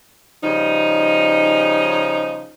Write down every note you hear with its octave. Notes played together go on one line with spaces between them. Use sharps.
C#3 F3 G3 D#4